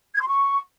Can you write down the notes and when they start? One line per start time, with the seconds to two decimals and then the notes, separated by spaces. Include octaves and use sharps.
0.15 G#6
0.21 C6
0.27 C#6